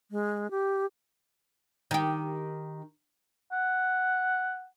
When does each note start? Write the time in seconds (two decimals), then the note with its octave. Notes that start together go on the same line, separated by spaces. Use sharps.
0.11 G#3
0.51 G4
1.91 D#3 G4
3.52 F#5